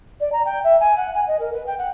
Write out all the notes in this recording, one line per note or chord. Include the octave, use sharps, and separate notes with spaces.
D5
A#5
G5
E5
G#5
F#5
G#5
D#5
A#4
B4
G5
F#5